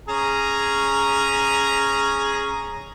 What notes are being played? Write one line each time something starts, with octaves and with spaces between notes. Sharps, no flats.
C#4 G#4 A#5